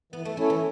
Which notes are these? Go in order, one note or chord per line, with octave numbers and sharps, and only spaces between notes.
E3 B3
A3
A3 C#4 E4 A4 C#5
E3